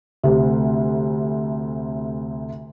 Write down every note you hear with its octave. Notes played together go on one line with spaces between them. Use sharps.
D2 C3